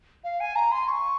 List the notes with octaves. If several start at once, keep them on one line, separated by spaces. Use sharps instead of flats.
F5
G#5
A#5
C6
C#6